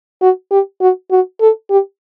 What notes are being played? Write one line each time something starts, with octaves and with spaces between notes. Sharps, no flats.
F#4
G4
F#4
F#4
A4
G4